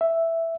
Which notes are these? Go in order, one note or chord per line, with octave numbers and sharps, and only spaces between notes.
E5